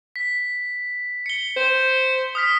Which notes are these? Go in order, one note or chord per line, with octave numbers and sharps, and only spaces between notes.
B6
C#7 G7
C5
D#6 F6 B6